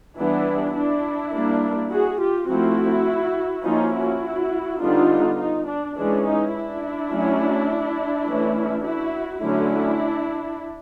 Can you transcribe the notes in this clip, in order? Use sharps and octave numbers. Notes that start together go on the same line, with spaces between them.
E3 G3 B3 D4 E4
D4 E4
G3 A#3 D4
F#4 G#4
F4 G4
F3 A3 C4 E4 F#4
F3 A#3 C#4 D#4 F4
E4 F#4
D3 G3 B3 D4 D#4 F4
D#4
D4
E3 G#3 C#4 D4
D#4
D4 E4
F#3 A3 C#4
E3 A3 C#4
E4 F#4
D3 F#3 A3 C#4 D4 E4